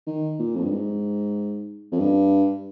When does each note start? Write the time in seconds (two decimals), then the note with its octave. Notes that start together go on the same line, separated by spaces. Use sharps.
0.07 D#3
0.39 A#2
0.56 F2
0.64 G2
0.71 G#2
1.92 F2
1.99 G2